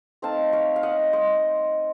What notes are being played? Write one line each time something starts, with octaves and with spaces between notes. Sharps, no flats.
A3 C4 D#4 F5 A5
C#5 F5
F5
D#5 F#5
C5 D#5